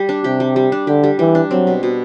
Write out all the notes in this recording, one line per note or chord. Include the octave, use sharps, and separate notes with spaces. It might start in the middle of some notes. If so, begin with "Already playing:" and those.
Already playing: G3
D4
C3 G4
G3
G3
D4
D3 G4
G3
E3 G3
D4
F#3 C4
B2
B2